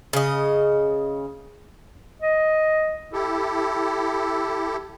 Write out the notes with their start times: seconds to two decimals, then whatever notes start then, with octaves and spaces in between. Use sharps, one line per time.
0.13 C#3 D#5
2.22 D#5
3.13 E4 G4 A4